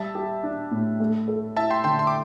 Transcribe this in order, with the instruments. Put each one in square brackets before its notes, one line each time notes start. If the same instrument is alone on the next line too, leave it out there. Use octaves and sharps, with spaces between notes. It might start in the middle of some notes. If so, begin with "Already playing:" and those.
Already playing: [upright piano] G3 [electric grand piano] E5 A5
[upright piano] G4
D4
A2
A3
A4
[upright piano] E4 [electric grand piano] E5 A5
[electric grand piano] G5 C6
[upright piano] D3 [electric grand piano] G5 C6
[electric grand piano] C6
D6